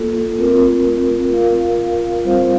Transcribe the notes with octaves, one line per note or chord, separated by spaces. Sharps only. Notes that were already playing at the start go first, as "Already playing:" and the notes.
Already playing: A#3 F4 A4
A3 C4 F4 A#4
F4 A#4 F5
G3 C4 F4 C5 F5